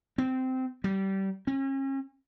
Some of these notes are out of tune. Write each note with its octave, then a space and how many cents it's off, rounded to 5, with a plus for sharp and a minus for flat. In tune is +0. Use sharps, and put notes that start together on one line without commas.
C4 -15
G3 -25
C#4 -40